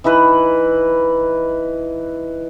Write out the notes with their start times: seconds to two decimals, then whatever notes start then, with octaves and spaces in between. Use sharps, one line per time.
0.04 E3 D#4 E4 B4